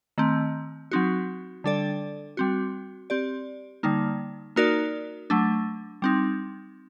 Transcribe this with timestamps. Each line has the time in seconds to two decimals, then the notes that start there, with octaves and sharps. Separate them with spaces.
0.18 D#3 A3 C4
0.91 F#3 C4 D#4 F#4
1.64 D3 G3 D4 A4 D5
2.37 G3 C4 F#4
3.10 C4 G4 D5
3.83 D3 G3 A#3 D#4
4.56 A#3 D#4 F#4 A#4 D5
5.30 F#3 A3 D4
6.02 G3 C4 D#4